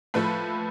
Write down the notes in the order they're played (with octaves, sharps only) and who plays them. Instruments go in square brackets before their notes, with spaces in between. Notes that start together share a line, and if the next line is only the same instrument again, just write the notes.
[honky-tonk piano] A2 F3 A3 B4 B5